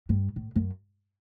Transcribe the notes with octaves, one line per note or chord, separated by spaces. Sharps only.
G2
A2
F#2